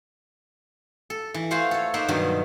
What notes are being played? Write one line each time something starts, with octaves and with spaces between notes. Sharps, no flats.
A4
E3
A3 F4 C5 F5 F#5 G#5
A4 C#5
A#3 D#4 C5 E5 F#5
G2 B2 D#3 F3 F#3